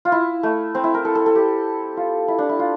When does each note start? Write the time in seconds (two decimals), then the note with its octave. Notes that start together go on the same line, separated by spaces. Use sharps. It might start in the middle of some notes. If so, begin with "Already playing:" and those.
0.05 F4
0.12 E4
0.43 A3
0.75 C4
0.84 E4
0.94 A#4
1.05 A4
1.15 A4
1.26 A4
1.36 G4
1.97 F4
2.28 E4
2.39 D4
2.49 E4
2.59 F4